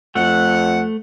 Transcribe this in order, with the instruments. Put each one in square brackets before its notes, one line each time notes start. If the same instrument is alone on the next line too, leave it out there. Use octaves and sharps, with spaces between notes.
[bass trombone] F2 [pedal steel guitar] A3 [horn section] F#5